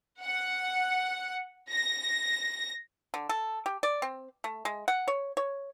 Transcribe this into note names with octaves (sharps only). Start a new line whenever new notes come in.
F#5
A#6
D3
A4
G4
D5
C4
A3
G#3
F#5
C#5
C#5